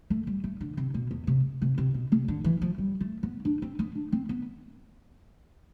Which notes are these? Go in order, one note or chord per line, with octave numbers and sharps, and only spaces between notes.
A3
G3
A3
D3
C3
B2
E2
C3
C3
C3
B2
C3
D3
E3
F3
G3
A3
B3
D4
C4
B3
D4
C4
B3